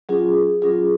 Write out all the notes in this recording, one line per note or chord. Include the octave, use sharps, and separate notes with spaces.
F#3 C#4 F4 G#4
F#3 C#4 F4 G#4